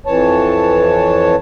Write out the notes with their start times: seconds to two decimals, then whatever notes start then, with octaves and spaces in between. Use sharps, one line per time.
0.06 F2 E3 C#5 A5